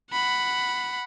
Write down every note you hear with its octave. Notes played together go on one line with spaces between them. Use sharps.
F#5 B5